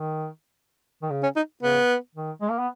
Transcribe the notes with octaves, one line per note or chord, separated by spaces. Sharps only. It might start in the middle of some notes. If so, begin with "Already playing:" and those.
Already playing: D#3
D#3
C#3
C#4
D#4
C#3 B3
D#3
G#3
A#3
B3